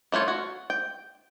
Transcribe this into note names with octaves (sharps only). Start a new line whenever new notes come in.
E3 A3 F4 C#5
F#4
G5